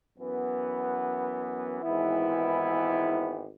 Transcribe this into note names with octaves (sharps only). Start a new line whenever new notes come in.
F#2 E3 B3
G#1 G#2 E3 B3 E4